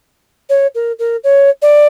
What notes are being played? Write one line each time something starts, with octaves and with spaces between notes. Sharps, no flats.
C#5
A#4
A#4
C#5
D5